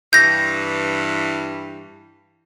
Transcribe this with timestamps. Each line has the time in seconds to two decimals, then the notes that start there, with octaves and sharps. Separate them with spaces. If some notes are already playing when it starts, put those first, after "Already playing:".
0.13 G2 E3 G6 A#6